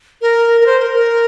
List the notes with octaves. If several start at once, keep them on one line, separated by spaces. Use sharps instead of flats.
A#4
A#4
C5
A#4
A#4